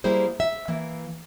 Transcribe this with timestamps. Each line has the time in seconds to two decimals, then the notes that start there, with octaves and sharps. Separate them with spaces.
0.04 G3 A#3 E4 G#4 C5
0.40 E5
0.68 E3 A#3